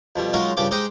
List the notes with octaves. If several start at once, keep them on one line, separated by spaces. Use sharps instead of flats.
F2 B2 G3
F#3 G#3 C#4 D#4 F4 A#4
G2 C#3 F3 G4 D6
G#3 D#4 G4 C5 D#5 G5